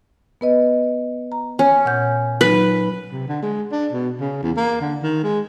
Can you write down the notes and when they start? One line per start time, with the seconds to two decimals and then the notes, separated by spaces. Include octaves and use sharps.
0.41 B3 B4 D#5
1.32 A#5
1.59 C#4
1.85 A#2 F#5 G6
2.41 F#3 D#4 B4
3.12 C3
3.28 D3
3.43 G#3
3.72 D4
3.92 B2
4.20 C#3
4.43 E2
4.57 A#3
4.81 D3
5.02 D#3
5.24 G#3